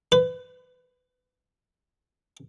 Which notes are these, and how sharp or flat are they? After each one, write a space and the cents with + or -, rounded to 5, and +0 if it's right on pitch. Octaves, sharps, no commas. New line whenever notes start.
B4 +30